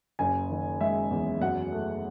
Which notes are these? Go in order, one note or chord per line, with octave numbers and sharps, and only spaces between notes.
F#1 G#5
D#3
G#3 E5
E2
F#2 F#5
A3